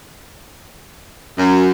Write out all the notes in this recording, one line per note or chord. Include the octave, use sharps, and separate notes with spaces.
F#2